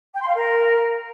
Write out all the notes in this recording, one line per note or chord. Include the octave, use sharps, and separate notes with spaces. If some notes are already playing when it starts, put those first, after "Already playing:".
G5
C6
F5
A#4